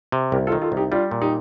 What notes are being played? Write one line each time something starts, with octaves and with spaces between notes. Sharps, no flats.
C3
C2 G4 A#4
F4 A4
D#3
F4 A4
C2
D#4 G4
G3 D4 F4
A#2
D#4 G4